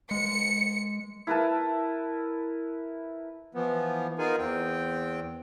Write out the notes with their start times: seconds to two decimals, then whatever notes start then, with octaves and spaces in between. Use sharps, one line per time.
0.11 G#3 C#7
1.27 E4 A#4 B4 A5
3.55 E3 F3 B3
4.18 B3 D#4 F4 G#4 A#4 G#5
4.39 E2 C4 G5